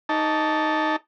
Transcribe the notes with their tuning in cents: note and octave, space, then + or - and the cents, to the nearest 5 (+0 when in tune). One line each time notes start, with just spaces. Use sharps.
D#4 +0 A5 +0 D6 -35